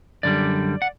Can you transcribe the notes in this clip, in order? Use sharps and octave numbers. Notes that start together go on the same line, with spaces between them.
F#2 D3 G3 D5
F#5